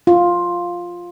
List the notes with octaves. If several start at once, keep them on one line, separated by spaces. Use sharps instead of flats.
F4